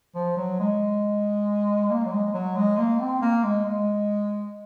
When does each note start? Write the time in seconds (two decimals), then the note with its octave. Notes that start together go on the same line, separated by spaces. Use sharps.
0.15 F3
0.37 F#3
0.60 G#3
1.90 A#3
2.05 F#3
2.12 G#3
2.34 F#3
2.56 G#3
2.78 A#3
2.99 C4
3.21 A#3
3.43 G#3
3.65 G#3